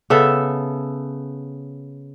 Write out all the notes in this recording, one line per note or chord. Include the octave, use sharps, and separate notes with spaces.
C#3 B3 A4 E5